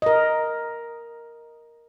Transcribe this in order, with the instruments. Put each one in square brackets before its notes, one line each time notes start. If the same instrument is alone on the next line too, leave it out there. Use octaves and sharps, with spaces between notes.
[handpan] A#4 D#5